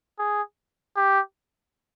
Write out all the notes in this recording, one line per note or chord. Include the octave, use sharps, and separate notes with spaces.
G#4
G4